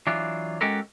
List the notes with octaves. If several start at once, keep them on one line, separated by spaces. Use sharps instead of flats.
E3 F#3 D4 F4
G#3 C#4 F#4 G4 A4 A#4